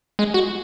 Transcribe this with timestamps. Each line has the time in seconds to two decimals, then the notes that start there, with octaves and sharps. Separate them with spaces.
0.19 G#3
0.34 F#4